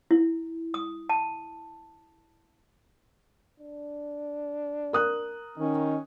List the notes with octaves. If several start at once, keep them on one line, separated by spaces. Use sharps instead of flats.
E4
D#6
A5
D4
A#4 D#6 F#6
D#3 C#4